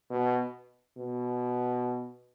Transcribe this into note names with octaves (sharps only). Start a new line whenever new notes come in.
B2
B2